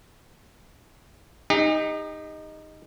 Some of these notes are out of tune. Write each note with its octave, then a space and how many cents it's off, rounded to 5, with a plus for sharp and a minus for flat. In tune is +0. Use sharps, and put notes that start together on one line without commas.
D#4 +0 G4 +45